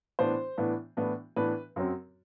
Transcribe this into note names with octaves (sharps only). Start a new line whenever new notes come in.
A2 E3 B3 D4 C5
A2 E3 B3 D4
A2 E3 B3 D4
A2 E3 B3 D4 B4
F#2 F#3 C4